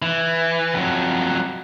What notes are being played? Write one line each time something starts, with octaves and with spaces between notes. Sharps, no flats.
E3
F2 F#3